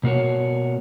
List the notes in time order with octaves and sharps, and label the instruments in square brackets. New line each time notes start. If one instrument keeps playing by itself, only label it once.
[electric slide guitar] B2 A#3 F#4 C#5